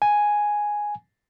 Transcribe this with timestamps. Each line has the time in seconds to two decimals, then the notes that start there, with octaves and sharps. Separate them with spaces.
0.02 G#5